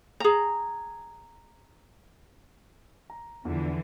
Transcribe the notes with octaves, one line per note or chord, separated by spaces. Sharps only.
G#4 A#5
A#5
E2 D3 E3 F3